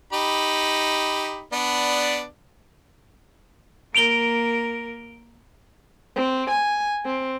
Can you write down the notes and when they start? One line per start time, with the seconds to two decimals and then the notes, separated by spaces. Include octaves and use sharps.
0.13 D#4 G4 B5
1.53 B3 D4 D5
3.95 A#3 A#4 D7 F7 G7
6.16 C4
6.50 G#5
7.06 C4